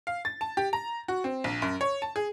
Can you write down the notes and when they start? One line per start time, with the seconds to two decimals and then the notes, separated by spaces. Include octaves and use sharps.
0.07 F5
0.25 A6
0.41 A5
0.57 G4
0.73 A#5
1.08 F#4
1.24 C4
1.44 A#1
1.62 F#2
1.81 C#5
2.02 A5
2.16 G#4